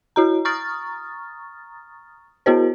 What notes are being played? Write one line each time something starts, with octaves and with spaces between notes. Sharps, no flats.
E4 F#4 A#5
A#5 C#6 D#6 F6 A6
B3 E4 F#4 A#4 C5